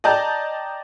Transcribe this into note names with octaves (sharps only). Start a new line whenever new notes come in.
D5 D#5 G5 A5 A#5 G6